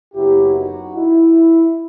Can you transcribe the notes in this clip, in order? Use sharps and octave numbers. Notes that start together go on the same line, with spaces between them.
F#1 F#2 F#3 B3 E4 G4
D#4 F#4
E4